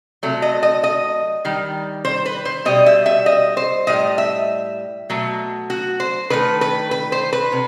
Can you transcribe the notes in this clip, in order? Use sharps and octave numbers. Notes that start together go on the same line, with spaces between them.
C3 F#3 A3
D#5
D#5
D#5
D#3 G3
C5
B4
C5
B2 G3 D#5
E5
E5
D#5
C5
A2 G3 D#5
E5
B2 F#3 A3
F#4
C5
D#3 A3 B4
B4
B4
C5
B4
C3